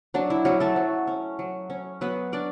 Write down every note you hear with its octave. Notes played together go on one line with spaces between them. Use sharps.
F#3 D4
E4
F#3 C#4 F#4
A3 A4
F#3
C#4
F#3
C#4
F#3 B3 B4
C#4 D4 D5